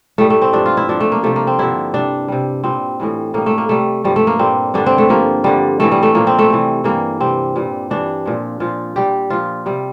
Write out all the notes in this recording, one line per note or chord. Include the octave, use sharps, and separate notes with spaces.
A2 G3 A3
A3
C4
G2 F3 D4
F4
E4
A#2 F3 D4
A3
A#3
C3 F3 A3
A#3
C4
G2 D3 F3 E4
C3 G3 D4
C3 G3
A#2 G3 C4
A2 E3 G3
A2 G3 A#3
A3
A#3
C3 G3 A3
G2 F3 G3
A3
A#3
A#2 G3 C4
G2 D3 G3 D4
C4
A3
G2 F3 A#3
G2 D3 F3 G3
A2 E3 G3 A3
G3
A3
A#2 F3 A#3
C4
A3
C3 E3 G3
G2 E3 G3 A#3
C3 G3 C4
A#2 G3
G2 E3 G3 D4
A#2 F3
A#2 F3 F4
A#2 G3 G4
A#2 F3 F4
C3 G3